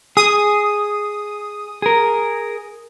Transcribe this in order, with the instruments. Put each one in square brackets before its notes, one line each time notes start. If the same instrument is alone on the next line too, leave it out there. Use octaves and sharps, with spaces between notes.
[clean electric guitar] G#4 [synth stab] D#6
[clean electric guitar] G#4 A#4